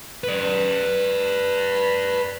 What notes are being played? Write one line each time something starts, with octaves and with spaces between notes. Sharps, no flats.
B4 D5